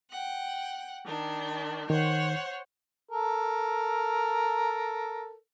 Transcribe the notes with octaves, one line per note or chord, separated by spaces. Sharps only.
F#5 G5
D#3 D4
D#3 C5 C#5 F#5
A4 A#4